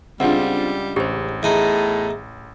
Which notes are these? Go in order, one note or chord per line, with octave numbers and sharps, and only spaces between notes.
C#2 G3 C4 D4 F4 F#5
A1 G4 C5
E2 A2 D#4